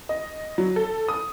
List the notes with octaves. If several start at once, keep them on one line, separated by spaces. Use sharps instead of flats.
D#5
F#3
A4
D#6